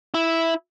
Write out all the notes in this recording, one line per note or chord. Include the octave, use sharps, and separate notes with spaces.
E4